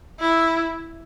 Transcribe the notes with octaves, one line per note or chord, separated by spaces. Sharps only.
E4